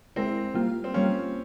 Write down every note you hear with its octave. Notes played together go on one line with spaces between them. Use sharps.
G#3 C4 E4 A#4
G3 A#3 F4
C4
G3 A#3 C#4 F4